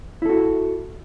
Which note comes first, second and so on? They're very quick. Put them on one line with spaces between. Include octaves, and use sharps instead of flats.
E4 A4 F#4